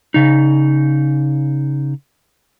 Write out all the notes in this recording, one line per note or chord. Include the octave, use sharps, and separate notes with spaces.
C#3 D#4